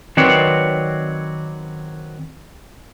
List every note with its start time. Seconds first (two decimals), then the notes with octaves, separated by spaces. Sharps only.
0.17 D#3 F#3 C4 B4 C#5 D5